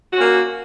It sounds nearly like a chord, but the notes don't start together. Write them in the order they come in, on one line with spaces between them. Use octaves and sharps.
F#4 C#4 A#3